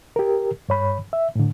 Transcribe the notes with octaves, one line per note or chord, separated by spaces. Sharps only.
G4 A#4
G2 C#5 B5
E5
A2 D3